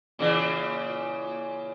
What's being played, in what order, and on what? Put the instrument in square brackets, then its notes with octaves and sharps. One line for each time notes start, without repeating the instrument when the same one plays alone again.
[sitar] A#2 C#3 E3